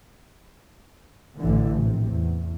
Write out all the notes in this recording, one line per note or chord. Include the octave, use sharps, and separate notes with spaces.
A1 A2 D3 E3
A#1 C3
E2